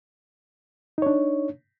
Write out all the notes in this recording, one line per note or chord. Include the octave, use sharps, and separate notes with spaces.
D4 D#4 C#5